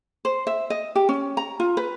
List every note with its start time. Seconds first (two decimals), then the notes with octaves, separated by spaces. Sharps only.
0.25 C5
0.47 E5
0.70 D#5
0.96 G4
1.09 C#4
1.37 A#5
1.60 F4
1.77 B4